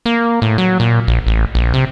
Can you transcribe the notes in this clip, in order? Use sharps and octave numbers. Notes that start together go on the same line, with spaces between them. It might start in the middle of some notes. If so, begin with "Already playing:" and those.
A#3
A2
F#3
A#2
A#1
A1
A#1
C3